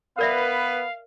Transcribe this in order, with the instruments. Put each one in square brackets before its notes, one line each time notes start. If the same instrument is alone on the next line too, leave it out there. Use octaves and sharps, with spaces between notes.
[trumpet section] B3 B4 [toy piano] A#4 D5 E5 [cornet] F5